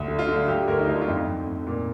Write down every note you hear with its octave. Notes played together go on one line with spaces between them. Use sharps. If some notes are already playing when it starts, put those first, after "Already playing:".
Already playing: D2
D3
F4
D3
D3 G4
D2 A#4
D#4
D3 F4
F4
F2 D#4
F2
F2
A#2